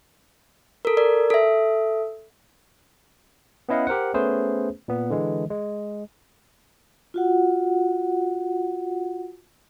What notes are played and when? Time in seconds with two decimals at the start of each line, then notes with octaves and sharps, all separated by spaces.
0.85 A4 A#4
0.97 A#4 D5
1.30 A4 E5
3.69 B3 C#4 E4 D#5 F5 F#5
3.87 G4 A#4 C5 F#5
4.14 A3 B3 C#4 G#4 B4 C5
4.88 A#2 B3
5.10 D3 E3 G#3
5.50 G#3
7.14 F4 F#4 F#5